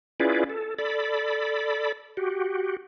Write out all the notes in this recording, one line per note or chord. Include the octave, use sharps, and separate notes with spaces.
C#4 E4 F4 G#4 B4 D5
A4
A4 D5 B5
F#4 G4